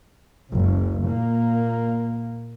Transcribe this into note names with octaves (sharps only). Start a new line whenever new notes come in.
F#1 C#2
A#2 A#3